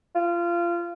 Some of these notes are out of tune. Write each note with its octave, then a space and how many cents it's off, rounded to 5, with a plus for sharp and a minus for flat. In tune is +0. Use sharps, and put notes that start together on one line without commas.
F4 -25